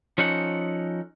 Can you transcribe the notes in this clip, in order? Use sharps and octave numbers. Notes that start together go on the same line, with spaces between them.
F3 C#4 D#4 A4 F#5